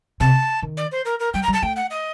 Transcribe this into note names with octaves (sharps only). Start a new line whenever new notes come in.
C3 A5
D#3
D5
C5
A#4
A#4
G3 G5
A#5
G3
A5
A3 G5
F#5
D#5